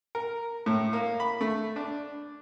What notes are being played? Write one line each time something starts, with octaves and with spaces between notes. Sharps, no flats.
A#4
A2
A#3
B5
A3
D4